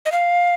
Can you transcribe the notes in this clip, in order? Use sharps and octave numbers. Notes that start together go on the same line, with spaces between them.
D#5
F5